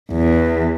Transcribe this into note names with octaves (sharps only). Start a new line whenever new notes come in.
E2